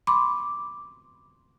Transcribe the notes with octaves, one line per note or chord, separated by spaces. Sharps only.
B5 C6 D6